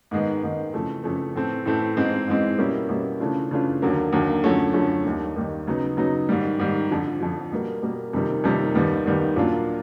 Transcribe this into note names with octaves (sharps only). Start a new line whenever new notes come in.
G#2 D#3 G#3 B3
G#2 D#3 G#3 B3
F2 C#3 E3 A3
F2 C#3 E3 A3
A2 E3 A3 C4
A2 E3 A3 C4
G#2 E3 G#3 C4
G#2 E3 G#3 C4
B2 G3 A#3 C#4 E4
B2 G3 A#3 C#4 E4
C#3 E3 A3 D4 F4
C#3 E3 A3 D4 F4
D#2 D3 F#3 A#3
D#2 D3 F#3 A#3
F#2 D3 F3 A3 C#4
F#2 D3 F3 A3 C#4
D#2 D#3 G3
D#2 D#3 G3
C#3 F#3 B3 D#4
C#3 F#3 B3 D#4
G#2 D#3 G3
G#2 D#3 G3
F2 D3 F3
F2 D3 F3
B2 G3 A#3
B2 G3 A#3
F2 C3 D#3 G3 A#3
F2 C3 D#3 G3 A#3
D#2 D#3 G3 B3
D#2 D#3 G3 B3
A#2 F#3 A#3 D4 F4